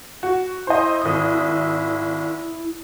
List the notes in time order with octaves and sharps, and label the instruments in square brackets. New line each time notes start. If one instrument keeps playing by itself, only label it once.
[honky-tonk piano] F#4
[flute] E4 [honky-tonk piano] C5 D#5
[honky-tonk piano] G#1 D#6